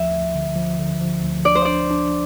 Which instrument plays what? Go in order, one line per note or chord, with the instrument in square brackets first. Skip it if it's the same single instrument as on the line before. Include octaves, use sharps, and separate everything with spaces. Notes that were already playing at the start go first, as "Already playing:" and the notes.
Already playing: [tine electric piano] D2 F3 [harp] E5
[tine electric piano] D2
D3
F3
D3
F3
D2
[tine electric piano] D4 [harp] D5
[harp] C5
[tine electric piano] D4 [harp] D5
[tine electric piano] D4